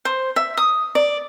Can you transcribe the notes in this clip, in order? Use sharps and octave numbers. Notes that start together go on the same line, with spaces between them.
C5
E5
D#6
D5